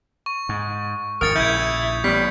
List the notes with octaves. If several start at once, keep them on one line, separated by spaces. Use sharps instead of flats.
C#6
G#2
G#1 F2 A#4 D#6 A6 C#7
A#1 C#3 E4 G6 G#6
A1 G3 B3 B6